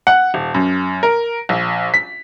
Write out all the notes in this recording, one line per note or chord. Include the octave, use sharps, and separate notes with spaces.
F#5
D#1
F#2
A#4
A#1
B6